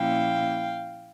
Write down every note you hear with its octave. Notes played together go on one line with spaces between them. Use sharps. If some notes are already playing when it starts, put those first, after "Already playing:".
Already playing: A#2 F3 A#3 C#4 E4 F5 G5